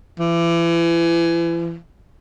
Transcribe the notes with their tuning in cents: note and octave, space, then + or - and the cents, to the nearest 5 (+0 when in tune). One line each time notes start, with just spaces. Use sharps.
E3 +35